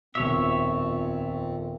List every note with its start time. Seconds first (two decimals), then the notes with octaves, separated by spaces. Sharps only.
0.15 D#1 F2 B2 C4 C#5 E5